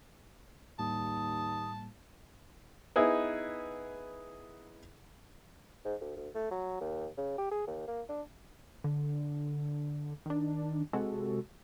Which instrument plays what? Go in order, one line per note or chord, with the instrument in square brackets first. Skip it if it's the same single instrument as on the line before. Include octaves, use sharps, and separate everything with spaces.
[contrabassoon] D#2 [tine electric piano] A2 G3 A#3 [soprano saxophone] A5 [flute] D#6
[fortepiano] B3 D#4 E4 G#4 B4
[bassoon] G#2
D2
D2
A3
F#3
D#2
C#3
G4
G#4
D#2
A#3
D4
[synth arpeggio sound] D3
D#3 D4
C3 G#3 F#4 A4